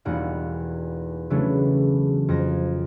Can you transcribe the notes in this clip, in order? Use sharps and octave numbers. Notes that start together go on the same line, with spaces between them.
E1 E2 G3 A#3 D#4 F#5
C#3 E3 F#3 A3 B3 D4
F2 A#6